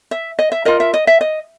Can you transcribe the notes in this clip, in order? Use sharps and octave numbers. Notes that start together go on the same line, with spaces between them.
E5
D#5
E5
F4 A#4 D#5
E5
D#5
E5
D#5